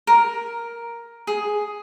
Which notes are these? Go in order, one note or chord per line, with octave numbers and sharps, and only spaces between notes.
A#4
G#4